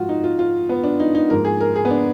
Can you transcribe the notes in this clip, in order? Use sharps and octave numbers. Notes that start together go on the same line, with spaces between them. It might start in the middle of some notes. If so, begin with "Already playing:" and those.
Already playing: G#2 F3 G#3 F4 F#4
D#4
F4
F4
B3
D4
D#4
D#4
G#2 F3 A#3 A#4
G#4
A#4
G#4
B3
D4